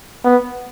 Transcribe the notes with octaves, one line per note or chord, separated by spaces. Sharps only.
B3